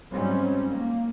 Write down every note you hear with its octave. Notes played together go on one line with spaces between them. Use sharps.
G#2 F#3 G3 C4 C#4
A#3